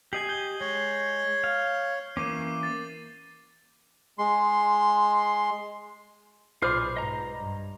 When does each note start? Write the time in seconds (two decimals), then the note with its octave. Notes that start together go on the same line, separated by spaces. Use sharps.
0.13 G4 D#5 G#5 C7 F#7
0.29 G6 G7
0.61 G#3 C#5
1.44 F5
2.17 E3 A#3 C#4 D6 D#7
2.63 A6
4.19 G#3 C6
6.62 B1 A#2 F4 G#4 B4 C5 D5 F6
6.97 G#2 D#5 A#5
7.38 G2